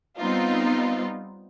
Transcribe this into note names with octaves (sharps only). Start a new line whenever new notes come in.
G3 B3 C4 D#4 F4